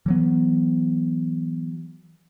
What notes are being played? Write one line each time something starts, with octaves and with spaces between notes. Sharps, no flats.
E3 F#3 B3